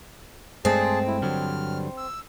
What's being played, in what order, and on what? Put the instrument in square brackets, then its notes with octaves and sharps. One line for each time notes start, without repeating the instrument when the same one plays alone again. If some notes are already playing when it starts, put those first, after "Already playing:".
[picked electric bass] G2 G#3 A3 [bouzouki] C4 [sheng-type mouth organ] G#4 A5
[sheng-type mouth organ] E4
[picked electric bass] G2 D3 F#3 [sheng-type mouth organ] F6
[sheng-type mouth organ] E6